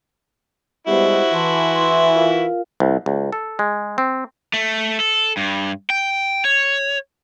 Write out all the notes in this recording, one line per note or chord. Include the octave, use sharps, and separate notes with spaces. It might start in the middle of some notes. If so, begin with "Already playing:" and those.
G3 G#3 B3 E4 F#4 G4 C5
E3 E5 A5 C6
C6
F4 A#4 F5
C2
C#2
A4
G#3
C4
A3
A4
G2
G5
C#5